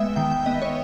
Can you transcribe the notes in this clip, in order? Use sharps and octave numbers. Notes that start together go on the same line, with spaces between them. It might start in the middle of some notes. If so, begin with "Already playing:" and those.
Already playing: G#3 B3 E5 G5
D#3 G5
G5
B3 D#5
C#5